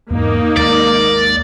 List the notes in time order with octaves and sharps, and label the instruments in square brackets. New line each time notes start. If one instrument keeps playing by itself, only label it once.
[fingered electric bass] E2 G#2 [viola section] A#3 D#4
[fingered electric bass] D#2 G#3 [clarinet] A#4 [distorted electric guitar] D5